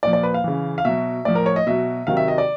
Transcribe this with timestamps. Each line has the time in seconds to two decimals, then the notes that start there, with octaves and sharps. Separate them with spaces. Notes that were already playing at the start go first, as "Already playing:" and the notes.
0.03 A#2 F3 D5
0.13 D5
0.23 B4
0.34 F5
0.44 C#3 E3
0.78 F5
0.85 B2 F#3 E5
1.25 A2 F3 D5
1.35 A#4
1.46 C#5
1.56 D#5
1.67 B2 F#3 E5
2.07 C3 D#3 F#3 F5
2.17 E5
2.28 D#5
2.38 D5